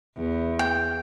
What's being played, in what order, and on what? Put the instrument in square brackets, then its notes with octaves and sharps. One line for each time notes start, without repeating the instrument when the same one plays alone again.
[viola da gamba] E2
[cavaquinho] G5